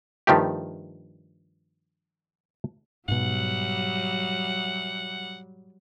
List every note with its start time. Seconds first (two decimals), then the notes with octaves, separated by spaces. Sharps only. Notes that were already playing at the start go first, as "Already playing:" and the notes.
0.27 G2 D#3 F3 A3 G4
3.08 G#2 B2 F#3 G3 F#5